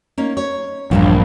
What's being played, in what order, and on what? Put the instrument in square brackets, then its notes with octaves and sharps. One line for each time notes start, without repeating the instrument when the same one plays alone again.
[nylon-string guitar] A#3 C#4 D#4
C#5
[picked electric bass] A#1 [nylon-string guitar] E2 G2 A#2